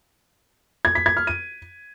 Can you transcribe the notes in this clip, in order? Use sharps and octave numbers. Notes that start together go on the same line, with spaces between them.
G#6
B6
G#6
F6
D#7